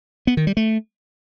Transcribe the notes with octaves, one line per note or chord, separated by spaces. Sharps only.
B3
D#3
G3
A3